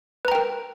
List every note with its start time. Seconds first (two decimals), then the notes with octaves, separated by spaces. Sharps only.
0.25 B4
0.28 A#5
0.32 G5
0.35 A#4